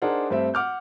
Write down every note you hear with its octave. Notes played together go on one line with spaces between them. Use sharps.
D4 D#4 G#4 A#4 C5 F#5
G2 A3 C4 E5
F#5 D6 F6 G6